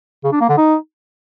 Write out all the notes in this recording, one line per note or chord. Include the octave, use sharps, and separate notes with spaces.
C#3
D4
A#3
D3
D#4